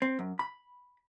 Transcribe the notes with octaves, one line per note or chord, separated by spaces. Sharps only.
C4
F#2
B5